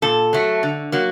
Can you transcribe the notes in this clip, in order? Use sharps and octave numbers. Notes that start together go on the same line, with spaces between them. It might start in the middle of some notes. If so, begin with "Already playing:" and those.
A#2 A4
F#3 A3
D3
F#3 A#3